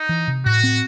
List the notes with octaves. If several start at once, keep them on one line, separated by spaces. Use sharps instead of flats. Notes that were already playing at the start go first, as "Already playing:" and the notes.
Already playing: D#4
E3
C3
A2 F#4
C4